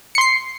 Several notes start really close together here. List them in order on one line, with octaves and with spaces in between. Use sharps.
C#7 C6 C7